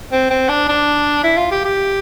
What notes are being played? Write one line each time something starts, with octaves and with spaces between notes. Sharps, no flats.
C4
C4
D4
D4
E4
F4
G4
G4